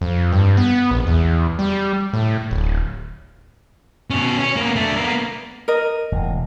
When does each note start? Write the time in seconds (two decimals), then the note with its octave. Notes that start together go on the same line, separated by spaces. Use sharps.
0.01 F2
0.32 G2
0.57 B3
0.91 A#1
1.07 E2
1.59 G3
2.13 A2
2.51 D1
4.10 B2 C#4
4.38 C#4
4.56 A#3 B3
4.76 A3 D4
4.97 A#3 B3
5.68 A#4 D#5
6.12 E1 A2